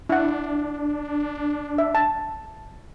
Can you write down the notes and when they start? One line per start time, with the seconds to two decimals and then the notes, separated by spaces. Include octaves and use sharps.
0.09 D4 E4 F#5
1.78 E5
1.95 A5